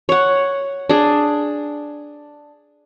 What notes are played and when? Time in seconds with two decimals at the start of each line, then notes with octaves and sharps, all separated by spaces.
0.09 C#5 F#5
0.89 D4 G#4